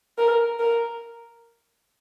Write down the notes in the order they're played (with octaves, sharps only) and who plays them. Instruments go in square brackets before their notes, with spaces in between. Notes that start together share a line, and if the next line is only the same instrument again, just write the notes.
[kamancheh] A#4
A#4